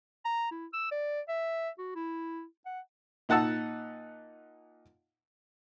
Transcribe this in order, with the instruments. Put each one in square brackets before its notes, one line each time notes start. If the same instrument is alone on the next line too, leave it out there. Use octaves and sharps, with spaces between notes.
[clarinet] A#5
E4
E6
D5
E5
F#4
E4
F#5
[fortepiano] A#2 D#4 F#5 A5 E6